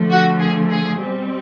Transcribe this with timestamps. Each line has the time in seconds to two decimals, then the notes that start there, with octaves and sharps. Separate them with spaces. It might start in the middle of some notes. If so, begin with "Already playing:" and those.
Already playing: D3 F3 A3
0.11 F#4
0.40 G#4
0.70 G#4
0.99 B2 G3 C4